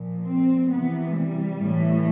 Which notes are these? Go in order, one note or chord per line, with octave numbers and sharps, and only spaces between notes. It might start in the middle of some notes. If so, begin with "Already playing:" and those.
Already playing: A#2 F3
C4
C3 E3 B3
G3
A2 E3